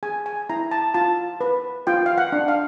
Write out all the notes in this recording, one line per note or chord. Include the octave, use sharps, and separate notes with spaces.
G#4 G#5
G#5
E4 A#5
A5
F4 A5
B4
F4 G5
F5
F#5
D4
F5